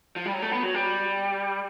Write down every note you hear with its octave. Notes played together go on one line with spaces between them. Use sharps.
F3
G3
F#3
A3
B3
F#3
G3